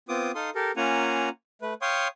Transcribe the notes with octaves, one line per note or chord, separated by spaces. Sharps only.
B3 C4 F4 D6 D#6
D#4 A4 F5 C6 D#6
G4 A4 A#4
A#3 C#4 F4 F#5 G#5 A#5
A3 B4
C#5 F5 G5 C6 C#6 D#6